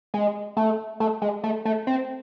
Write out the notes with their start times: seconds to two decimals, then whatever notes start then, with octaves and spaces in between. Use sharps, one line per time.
0.14 G#3
0.57 A3
1.00 A3
1.22 G#3
1.44 A3
1.65 A3
1.87 C4